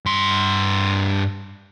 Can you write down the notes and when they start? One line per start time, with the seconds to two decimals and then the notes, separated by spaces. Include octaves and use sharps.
0.06 G2 C6